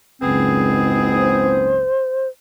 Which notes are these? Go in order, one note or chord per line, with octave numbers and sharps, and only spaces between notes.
F#1 C#2 G#2 B3 C4 G#4
C5